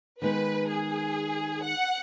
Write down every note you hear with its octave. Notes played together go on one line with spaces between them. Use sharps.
D#3 G#3 B3 D#4 B4
G#4
F#5